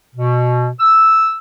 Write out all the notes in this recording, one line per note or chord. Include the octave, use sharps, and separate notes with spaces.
B2
E6